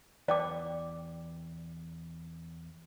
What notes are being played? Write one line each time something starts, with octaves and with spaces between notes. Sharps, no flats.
E2 B4 D5 G5 A5 D6